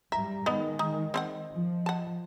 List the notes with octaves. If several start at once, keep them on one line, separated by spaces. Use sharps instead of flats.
G2 G3 E5 A#5
D#3 G#3 B3 D#5
D#4
C4 F5 F#5
F3
F#5 A5